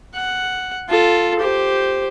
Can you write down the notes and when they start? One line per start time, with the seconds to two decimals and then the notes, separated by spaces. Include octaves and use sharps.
0.14 F#5
0.89 F4 A4
1.39 G4 C5